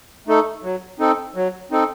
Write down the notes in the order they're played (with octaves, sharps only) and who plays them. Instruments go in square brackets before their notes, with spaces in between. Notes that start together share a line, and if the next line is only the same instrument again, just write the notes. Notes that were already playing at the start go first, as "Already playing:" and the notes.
[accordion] A3 D#4 A4
F#3
C4 D#4 A4
F#3
C4 D#4 A4